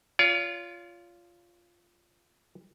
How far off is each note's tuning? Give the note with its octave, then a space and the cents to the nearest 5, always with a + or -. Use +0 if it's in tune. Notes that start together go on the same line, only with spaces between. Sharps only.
F4 -5 C#5 +45